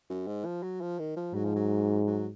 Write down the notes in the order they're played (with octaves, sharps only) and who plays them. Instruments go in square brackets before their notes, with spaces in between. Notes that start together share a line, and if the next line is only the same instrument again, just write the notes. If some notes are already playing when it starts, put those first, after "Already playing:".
[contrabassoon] F#2
G#2
F3
F#3
F3
D#3
F3
[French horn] G#2 [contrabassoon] F#3
[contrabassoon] F3
F#3
F#3